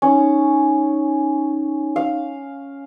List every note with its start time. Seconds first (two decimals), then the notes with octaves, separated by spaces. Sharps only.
0.02 C#4 D#4
1.96 F5